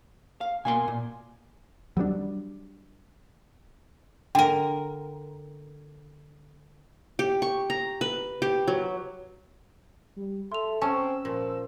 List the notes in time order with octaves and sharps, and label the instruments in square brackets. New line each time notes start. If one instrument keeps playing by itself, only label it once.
[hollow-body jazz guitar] F5
[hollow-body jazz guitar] B2 A#3 C6 [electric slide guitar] G#5
[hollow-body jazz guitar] A#2
[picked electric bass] F#3 G3 B3 D4
[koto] D3 A#4 [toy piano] G5
[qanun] G4
C#6
A#5
B4
G4
F#3
[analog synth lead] G3
[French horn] A4 [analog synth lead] E5 [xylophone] C6 F7
[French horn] C4 [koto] C#4 [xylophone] G#5 A5 C#6 [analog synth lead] E6
[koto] A#2 [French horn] F3